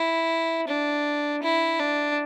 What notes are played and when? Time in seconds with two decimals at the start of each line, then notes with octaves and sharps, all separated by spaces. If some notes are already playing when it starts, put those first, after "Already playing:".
Already playing: E4
0.67 D4
1.43 E4
1.80 D4